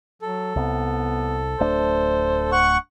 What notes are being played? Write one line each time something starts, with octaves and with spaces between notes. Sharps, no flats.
F#3 A4
C2 B3
D1 A3 D4 C5
F#5 C#6